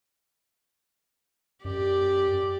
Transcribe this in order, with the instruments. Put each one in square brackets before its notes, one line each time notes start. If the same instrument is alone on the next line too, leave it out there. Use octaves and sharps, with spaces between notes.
[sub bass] F#2 [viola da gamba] G4 D5